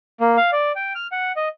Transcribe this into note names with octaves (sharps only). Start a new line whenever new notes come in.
A#3
F5
D5
G5
F6
F#5
D#5